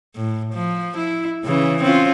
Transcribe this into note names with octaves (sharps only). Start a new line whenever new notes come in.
A2
F3
E4
C#3 E3
C4 C#4 F4